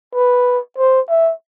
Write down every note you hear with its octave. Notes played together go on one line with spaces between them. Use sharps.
B4
C5
E5